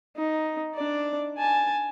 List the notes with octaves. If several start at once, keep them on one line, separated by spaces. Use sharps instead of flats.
D#4
D4 D5
G#5 A5